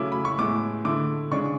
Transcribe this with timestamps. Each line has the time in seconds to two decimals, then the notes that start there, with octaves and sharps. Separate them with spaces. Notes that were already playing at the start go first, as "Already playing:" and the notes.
Already playing: C#3 F#3 A3 C#4 E4 D6
0.12 B5
0.25 C#6
0.38 A2 G#3 B3 E4 D6
0.84 D3 A3 E4 D6
1.31 C#3 G#3 D4 C#6